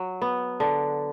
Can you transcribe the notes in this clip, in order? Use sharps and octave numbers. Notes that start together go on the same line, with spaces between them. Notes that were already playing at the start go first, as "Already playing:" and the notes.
Already playing: F#3
B3
D3